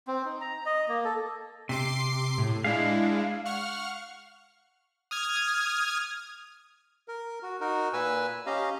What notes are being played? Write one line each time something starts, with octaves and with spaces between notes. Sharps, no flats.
C4
D#4
A#5
D#5
A#3
A4
C3 C6 D6 C7
A2
G#3 D4 E4 F5
F#5 C#6 F6
D#6 F6 G#6
A#4
F#4
D#4 F#4 A#4
A#2 B4 G#5 E6
C#4 G4 D#5 F5 A#5